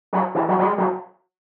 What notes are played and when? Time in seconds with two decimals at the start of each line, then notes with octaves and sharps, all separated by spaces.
0.13 F#3
0.35 E3
0.48 F#3
0.59 F#3
0.63 G#3
0.78 F#3